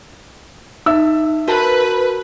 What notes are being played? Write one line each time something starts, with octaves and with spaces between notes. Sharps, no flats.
D#4 E5 E6
F#4 A#4 B4 A5